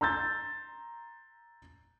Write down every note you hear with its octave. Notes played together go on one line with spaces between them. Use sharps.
A#5 C6 E6 G6 A6